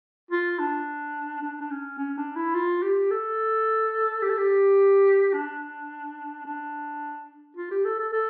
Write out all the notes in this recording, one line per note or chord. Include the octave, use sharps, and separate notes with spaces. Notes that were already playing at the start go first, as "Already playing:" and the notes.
F4
D4
D4
D4
C#4
C#4
D4
E4
F4
G4
A4
G4
A4
G4
D4
D4
F4
G4
A4
A4
A4